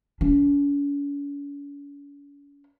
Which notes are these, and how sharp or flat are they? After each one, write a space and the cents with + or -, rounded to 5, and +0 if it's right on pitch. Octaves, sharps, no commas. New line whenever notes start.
C#4 +45